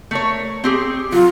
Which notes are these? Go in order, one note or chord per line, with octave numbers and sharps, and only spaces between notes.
A3 A#4 C#5
C4 G4 G#4
F#3 F4